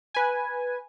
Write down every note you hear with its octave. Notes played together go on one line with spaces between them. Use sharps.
B4 G#5